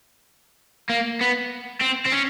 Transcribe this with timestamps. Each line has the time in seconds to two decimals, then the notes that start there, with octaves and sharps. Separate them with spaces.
0.89 A#3
1.21 B3
1.81 C4
2.05 C4
2.12 C#4